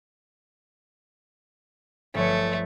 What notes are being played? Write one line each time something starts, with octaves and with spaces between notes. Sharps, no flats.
G1 F3 A3 C#5